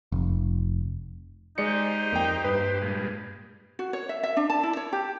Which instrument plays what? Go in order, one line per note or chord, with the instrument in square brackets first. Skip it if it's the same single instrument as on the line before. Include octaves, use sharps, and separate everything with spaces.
[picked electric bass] F1
[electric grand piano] G#3 D5 C#7 [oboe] D#4 [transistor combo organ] G4 C5
[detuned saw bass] F2 [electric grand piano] A#3 G5
[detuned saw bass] G2 [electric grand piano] B4
[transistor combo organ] A#2 G3 G#3
[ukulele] F#4
C#5
E5
E5
D4
A5
E4
C#5
G4